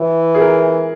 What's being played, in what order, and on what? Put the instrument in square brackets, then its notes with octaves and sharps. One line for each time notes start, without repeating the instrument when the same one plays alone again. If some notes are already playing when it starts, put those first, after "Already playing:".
Already playing: [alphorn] E3
[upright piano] G#4
A#4